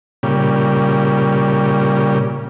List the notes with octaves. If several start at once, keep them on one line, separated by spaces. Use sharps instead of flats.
A#2 C#3 G3